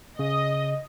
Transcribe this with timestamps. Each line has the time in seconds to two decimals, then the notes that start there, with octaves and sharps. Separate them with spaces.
0.19 C#3 D#5